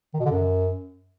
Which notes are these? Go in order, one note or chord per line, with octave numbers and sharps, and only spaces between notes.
D#3
B2
D3
F#2